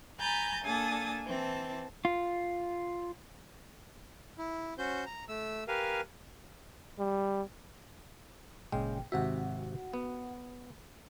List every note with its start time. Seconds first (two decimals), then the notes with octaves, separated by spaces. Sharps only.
0.19 G#5 A#5 B5 G6 A6
0.64 A#3 D4 A4 G#5 D#6 A6
1.25 E3 C4 A5
2.05 F4
4.38 E4
4.78 C#4 F#4 C5 G6
5.06 A#5
5.28 A3 E6
5.68 G4 A#4 B4 F5 G#5
6.99 G3
8.72 G1 A#2 C#3 G#3 G5
9.12 G#1 C3 F#4 E5 F#5
9.94 B3